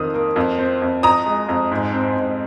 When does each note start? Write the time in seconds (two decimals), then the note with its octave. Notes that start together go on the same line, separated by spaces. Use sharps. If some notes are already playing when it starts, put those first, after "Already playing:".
Already playing: F2 D#3 D#6
0.14 A#3
0.36 F2
0.59 C4
0.82 F2
1.03 F2 A#5 D#6
1.26 G#3
1.49 F2
1.72 G#2
1.94 C4
2.16 G#2